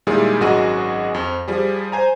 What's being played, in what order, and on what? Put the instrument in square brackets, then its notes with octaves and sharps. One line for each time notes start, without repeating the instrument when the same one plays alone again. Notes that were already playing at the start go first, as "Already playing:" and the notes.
[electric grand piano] A#2 D#3 G3 G#3 E4 G#4
G#1 F#2 F#4 G#4 D#5 D#7
F2
F3 G3 G#4
C5 G#5 A#5